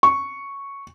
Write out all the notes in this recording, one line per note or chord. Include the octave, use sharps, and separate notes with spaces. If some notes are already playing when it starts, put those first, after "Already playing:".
C#6